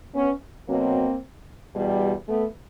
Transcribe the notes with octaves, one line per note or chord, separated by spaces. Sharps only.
B3 C#4
B2 F#3 A#3 C4
E2 B2 G3
A3 B3